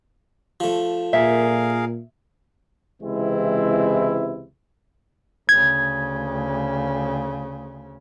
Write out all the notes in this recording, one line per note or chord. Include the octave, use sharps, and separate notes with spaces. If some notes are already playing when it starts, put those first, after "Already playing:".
F3 A3
A#2 G#4 A#4 E5 F5
C#2 C3 E3 G#3 C4 E4
D2 C#3 G#6